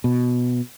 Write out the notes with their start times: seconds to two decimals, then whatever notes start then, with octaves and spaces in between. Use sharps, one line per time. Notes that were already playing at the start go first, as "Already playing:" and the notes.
0.04 B2